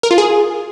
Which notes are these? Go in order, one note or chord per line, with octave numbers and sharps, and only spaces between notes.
A#4
F4
G#4